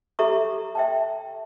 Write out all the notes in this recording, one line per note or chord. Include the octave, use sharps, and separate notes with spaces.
G4 A4 E5 A#5 C#6 D6
E5 G5 A5